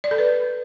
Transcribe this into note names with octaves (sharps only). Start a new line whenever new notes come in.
D5
A4
B4